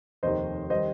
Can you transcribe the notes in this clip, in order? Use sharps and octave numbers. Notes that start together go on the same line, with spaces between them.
F1 D#2 D#3 C5 D#5
D#3 G3 C5 D#5